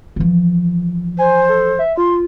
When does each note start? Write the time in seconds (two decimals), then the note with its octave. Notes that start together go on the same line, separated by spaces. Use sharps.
0.16 E3 F3
1.19 C5 G#5
1.49 A4
1.79 E5
1.97 F4 C6